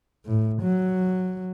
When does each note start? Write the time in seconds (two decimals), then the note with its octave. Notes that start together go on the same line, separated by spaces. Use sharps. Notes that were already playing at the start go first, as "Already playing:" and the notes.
0.26 A2
0.62 F#3